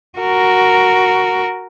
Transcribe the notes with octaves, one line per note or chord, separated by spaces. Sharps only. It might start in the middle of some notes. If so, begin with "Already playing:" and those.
F#4 A#4